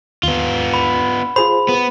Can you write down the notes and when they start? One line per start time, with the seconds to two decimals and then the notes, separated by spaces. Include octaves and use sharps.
0.23 D#2 B3 F4
0.74 B5
1.36 F4 G#4 C5 B5
1.69 B3